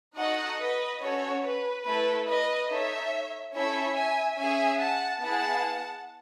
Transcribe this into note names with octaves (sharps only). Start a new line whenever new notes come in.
D#4 F#4 A4 D#5 F#5
B4 D#5
C#4 F#4 A4 C#5
B4
A3 E4 A4 B4
B4 D#5
D#4 A4 C#5 E5
C#4 E4 A4 C#5 E5
E5 G#5
C#4 G#4 E5 G#5
F#5 A5
B3 E4 G#4 F#5 A5